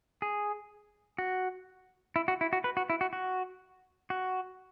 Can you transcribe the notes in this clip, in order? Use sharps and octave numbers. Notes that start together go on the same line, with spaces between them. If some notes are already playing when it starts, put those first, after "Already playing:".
G#4
F#4
E4
F#4
E4
F#4
B4
F#4
E4
F#4
F#4
F#4